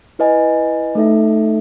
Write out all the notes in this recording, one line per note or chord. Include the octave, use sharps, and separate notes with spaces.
E4 B4 D#5 G#5
A3 D#4 A4 E5